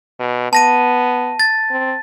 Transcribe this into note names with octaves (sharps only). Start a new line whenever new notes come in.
B2
B3 A5 A#6 D#7
A6
C4